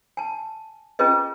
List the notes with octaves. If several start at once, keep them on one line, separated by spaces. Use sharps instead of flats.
G#5 A5
C#4 F4 G#4 B4 D#5